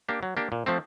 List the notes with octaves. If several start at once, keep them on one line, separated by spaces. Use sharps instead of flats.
A#3 D4 G4
F#3
A#3 D4 G4
A#2
F3 A3 C4